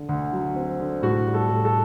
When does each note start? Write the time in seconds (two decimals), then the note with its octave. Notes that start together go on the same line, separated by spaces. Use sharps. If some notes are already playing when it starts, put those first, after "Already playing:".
Already playing: D3
0.09 D2
0.33 F#3
0.55 C4
0.80 D3
1.02 A2 F#4
1.27 G3
1.34 A4
1.50 A2
1.65 A4